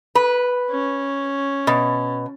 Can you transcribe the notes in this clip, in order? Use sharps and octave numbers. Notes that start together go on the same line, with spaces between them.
B4
C#4
B2